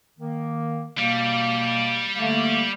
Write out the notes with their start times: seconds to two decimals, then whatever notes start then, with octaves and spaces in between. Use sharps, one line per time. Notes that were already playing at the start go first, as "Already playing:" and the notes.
0.19 D#3 A#3
0.98 B2 G3 A#3
2.15 D3 A3 A#3